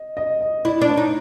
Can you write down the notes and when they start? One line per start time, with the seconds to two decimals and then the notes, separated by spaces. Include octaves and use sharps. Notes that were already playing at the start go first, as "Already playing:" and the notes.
Already playing: D#5
0.17 D#5
0.41 D#5
0.65 E4 D5
0.81 D4
0.89 C#5
0.97 D#4